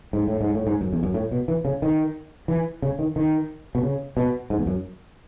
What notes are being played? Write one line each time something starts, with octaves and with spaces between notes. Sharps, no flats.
G#2
A2
G#2
A2
G#2
F#2
E2
F#2
A2
B2
E3
C#3
D#3
E3
C#3
D#3
D#3
B2
C#3
B2
G#2
E2
F#2